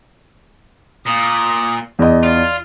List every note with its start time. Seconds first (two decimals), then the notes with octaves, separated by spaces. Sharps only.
1.06 A#2 D#6
1.99 E2 D5 D#5
2.23 F4